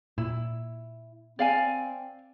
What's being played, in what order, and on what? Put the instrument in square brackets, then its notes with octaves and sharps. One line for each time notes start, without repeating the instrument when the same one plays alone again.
[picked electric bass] A#2 [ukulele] E4
[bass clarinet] C4 [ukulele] D5 F5 G#5